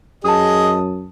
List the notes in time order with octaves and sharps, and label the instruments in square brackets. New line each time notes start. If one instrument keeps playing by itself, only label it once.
[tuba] F#2 [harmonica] G#4 D#5 [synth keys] A5 D#6